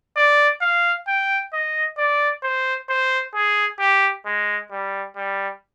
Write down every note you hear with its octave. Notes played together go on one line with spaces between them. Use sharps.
D5
F5
G5
D#5
D5
C5
C5
G#4
G4
G#3
G3
G3